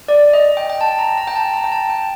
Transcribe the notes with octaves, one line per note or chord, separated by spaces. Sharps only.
D5
D#5
G5
G5
A5
A#5
A#5
G5
A5
A#5
G5
A5
G5